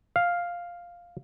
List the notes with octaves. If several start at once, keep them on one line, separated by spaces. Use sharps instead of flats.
F5